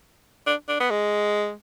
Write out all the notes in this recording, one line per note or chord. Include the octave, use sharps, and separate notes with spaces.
D4
D4
B3
G#3